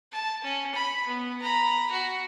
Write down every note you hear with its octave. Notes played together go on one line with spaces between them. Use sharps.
A5
C#4
B5
B3
A#5 B5
F#4